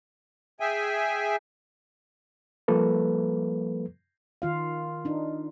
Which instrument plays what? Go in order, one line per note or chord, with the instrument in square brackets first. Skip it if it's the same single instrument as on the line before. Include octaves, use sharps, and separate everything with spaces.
[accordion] G#4 E5 G5 G#5
[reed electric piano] F3 G3 A#3 A4 B4
[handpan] D#3 F4 F5
D4 D#4